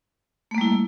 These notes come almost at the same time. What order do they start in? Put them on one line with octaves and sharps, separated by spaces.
A3 A#3 G3 E4